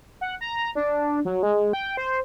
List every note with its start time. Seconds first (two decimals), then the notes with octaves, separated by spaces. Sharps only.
0.21 F#5
0.41 A#5
0.75 D4
1.25 F#3
1.43 G#3
1.73 G5
1.97 C5